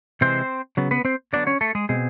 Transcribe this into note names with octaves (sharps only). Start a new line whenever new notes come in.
C3 E3 G#3 C4 C5
C#3 F#3 B3
B3 B4
C4 C5
D3 F#3 B3 D4 D5
C#4 C#5
A3 A4
G#3 G#4
B2 G#3 C4 G#4